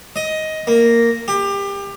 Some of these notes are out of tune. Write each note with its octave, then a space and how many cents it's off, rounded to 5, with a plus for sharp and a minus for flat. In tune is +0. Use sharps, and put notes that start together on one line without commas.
D#5 +10
A#3 -5
G4 +25